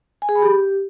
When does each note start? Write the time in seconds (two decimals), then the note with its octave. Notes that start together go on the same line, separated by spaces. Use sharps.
0.22 G#5
0.29 G#4
0.35 B5
0.42 G4